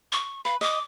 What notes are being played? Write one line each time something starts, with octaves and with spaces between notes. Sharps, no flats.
C#6
B4 F5
D#5 D6